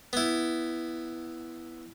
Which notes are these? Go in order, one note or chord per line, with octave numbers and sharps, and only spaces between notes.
B3 E4